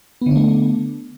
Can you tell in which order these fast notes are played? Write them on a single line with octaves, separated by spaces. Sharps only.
B3 D3 D4 A3